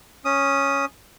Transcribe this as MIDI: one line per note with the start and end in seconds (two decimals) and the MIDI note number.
0.25 0.85 61
0.25 0.85 87